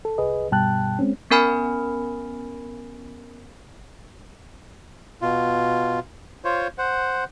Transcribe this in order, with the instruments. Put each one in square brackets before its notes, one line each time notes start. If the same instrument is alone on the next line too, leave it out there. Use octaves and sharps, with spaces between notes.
[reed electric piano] A4
C2 G#4 B4 D#5
G2 B2 G3 G5 A5 F#6
G#3 C4 C#4
[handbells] B3 C#4 A#4 G#5 B5 F6
[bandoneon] B2 F4
F4 C5 C#5
C5 F#5